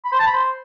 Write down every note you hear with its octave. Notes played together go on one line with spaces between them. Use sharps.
B5
C5
A5
B5
C5